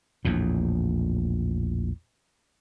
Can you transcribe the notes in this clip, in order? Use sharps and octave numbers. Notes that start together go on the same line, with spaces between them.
A#1 E2 A2